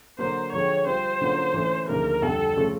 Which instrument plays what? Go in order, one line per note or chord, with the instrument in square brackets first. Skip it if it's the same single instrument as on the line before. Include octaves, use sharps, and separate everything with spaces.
[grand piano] D3 F#3 A#3 [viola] C5
[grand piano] D3 F3 G#3 C4 [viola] C#5
[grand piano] G3 C4 F4 [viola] C5
[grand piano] D3 F#3 A#3 C#4 F4
E3 A3 C#4
[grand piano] D2 C#3 F3 A#3 D#4 [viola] A#4
[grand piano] F2 D3 G3 [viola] A4
[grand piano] C#3 F3 A3